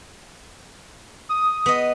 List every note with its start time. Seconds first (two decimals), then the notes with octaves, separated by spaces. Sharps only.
1.29 D#6
1.66 B3 D#5